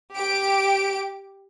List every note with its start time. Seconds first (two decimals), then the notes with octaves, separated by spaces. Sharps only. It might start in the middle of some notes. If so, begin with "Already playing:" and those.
0.18 G4 D7